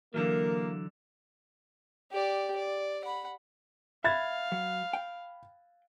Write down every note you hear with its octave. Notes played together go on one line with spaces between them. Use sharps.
D3 E3 F#3 A#3 A#4
G4 D5
D5
F#5 B5
E5 F5 B5 G#6 A6
F#3
G5